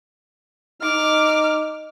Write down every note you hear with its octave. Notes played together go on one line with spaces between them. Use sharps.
D#4 D6 F6